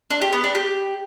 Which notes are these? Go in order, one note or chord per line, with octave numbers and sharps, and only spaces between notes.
D4
G4
B3
D4
G4